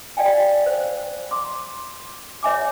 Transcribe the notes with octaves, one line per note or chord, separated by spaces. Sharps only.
D5 F5 G5 G#5
C5 F5
C6 D6
C#5 E5 G#5 D6